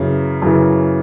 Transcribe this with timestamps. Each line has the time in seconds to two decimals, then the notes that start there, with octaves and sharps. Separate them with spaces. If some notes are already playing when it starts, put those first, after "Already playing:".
Already playing: F#2 C#3 E3
0.42 F#2 C#3 E3